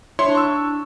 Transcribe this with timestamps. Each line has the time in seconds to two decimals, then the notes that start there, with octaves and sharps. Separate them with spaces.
0.19 D4 E4 C#5 C6
0.35 C#6 E6